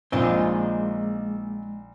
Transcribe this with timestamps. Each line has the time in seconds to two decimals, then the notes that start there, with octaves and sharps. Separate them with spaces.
0.12 A#1 G#3 A#3 C4 D#4 F4 D#5 G#5